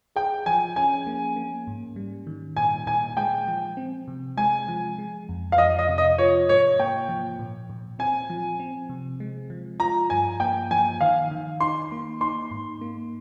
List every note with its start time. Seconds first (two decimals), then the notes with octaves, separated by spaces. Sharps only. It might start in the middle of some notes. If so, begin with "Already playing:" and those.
0.16 G#4 G5
0.46 F3 G#5
0.76 C#4 G#5
1.07 A#3
1.36 A#3
1.67 G#2
1.96 G3
2.27 D#3
2.56 A#2 G#5
2.87 A#2 G#5
3.17 G#3 G5
3.48 F3
3.77 C4
4.08 C3
4.37 G#3 G#5
4.68 F3
4.98 G#3
5.29 F2
5.52 F5
5.58 F3 D#5
5.79 D#5
5.89 C3
5.98 D#5
6.18 F4 C#5
6.49 G#2 C#5
6.80 A#3 G5
7.09 F3
7.39 A#2
7.70 A#2
7.99 C4 G#5
8.30 F3
8.60 C4
8.89 C3
9.20 G#3
9.50 F3
9.80 F4 A#5
10.10 G2 G#5
10.40 A#3 G5
10.71 F3 G#5
11.01 D#3 F5
11.31 D#3
11.60 D#4 C6
11.92 A#3
12.21 D#4 C6
12.51 G#2
12.81 A#3